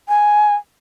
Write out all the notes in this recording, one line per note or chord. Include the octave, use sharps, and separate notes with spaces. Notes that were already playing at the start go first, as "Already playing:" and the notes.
G#5